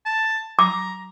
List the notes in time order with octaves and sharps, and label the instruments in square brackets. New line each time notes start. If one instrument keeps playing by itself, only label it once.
[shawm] A5
[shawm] A#5 [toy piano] D6